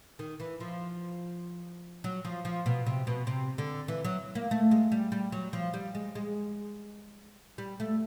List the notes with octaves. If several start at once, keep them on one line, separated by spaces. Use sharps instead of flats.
D#3
E3
F3
F#3
F3
F3
B2
C3
B2
C3
D3
E3
F#3
A#3
A3
G#3
G3
G3
F#3
F3
G3
G#3
G#3
G3
A3